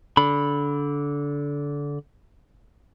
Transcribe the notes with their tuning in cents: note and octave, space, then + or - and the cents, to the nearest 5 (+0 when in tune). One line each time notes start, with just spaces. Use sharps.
D3 -20 B5 +0